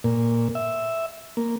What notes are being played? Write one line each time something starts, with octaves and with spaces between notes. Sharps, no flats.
A#2
E5
A#3